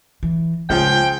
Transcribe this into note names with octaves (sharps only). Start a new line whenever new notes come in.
E3
C#2 F3 G#3 G#4 G5